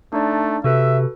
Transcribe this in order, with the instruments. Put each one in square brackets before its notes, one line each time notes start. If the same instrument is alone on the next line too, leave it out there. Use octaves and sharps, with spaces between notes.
[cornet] A3 [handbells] D4 D#4 D5
[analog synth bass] C3 [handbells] F#4 A4 B4 [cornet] E5